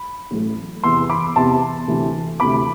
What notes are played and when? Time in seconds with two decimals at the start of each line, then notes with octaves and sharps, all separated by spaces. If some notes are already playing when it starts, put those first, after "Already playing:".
Already playing: B5
0.31 A1 A2 F#3 A3
0.84 E2 C3 E3 B3 C6 E6
1.10 B5 D6
1.36 E2 C3 E3 B3 A5 C6
1.88 D2 C3 E3
2.40 D2 C3 E3 B5 D6